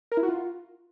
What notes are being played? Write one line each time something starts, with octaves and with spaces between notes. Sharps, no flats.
A#4
E4
F#4
F4